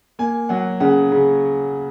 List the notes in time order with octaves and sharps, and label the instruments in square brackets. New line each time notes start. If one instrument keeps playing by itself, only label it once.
[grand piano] A#3 G#5
F#3 F#5
C#3 F#5
C#3